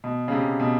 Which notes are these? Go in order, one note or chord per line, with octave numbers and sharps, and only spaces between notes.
B2
C#3
C3
B2